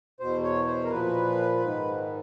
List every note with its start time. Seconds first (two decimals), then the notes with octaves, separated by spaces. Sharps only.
0.20 E2 B2 C5
0.44 C#5
0.67 C5
0.85 A#4
0.90 A#2 F3 B4
1.62 G#2 D#3